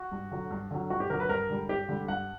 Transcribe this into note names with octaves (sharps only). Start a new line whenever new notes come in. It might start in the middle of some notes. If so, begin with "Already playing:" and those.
Already playing: F#4
G2
D3 F#3
G2
D3 F#3
G2 F#4
G4
D3 F#3 A#4
B4
G2 A#4
D3 G3
G2 G4
D3 G3
G2 F#5